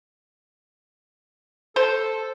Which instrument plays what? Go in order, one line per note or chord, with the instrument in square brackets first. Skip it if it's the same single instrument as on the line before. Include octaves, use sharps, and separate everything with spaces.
[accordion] A4 [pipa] C5